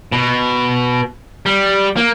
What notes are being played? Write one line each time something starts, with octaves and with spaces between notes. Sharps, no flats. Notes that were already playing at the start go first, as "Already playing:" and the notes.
B2
G3
A#3